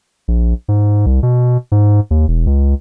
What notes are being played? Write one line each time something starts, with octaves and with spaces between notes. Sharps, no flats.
A#1
G#2
C2
B2
G#2
D#2
E1
C#2